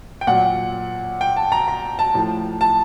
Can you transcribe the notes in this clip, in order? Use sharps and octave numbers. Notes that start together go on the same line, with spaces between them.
G5
A#2 F#3 F#5
G5
A5
A#5
A#5
A5
A2 F3
A5